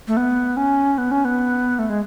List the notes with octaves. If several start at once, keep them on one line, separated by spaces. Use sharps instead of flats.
A3
B3
C#4
B3
C#4
B3
A3
G#3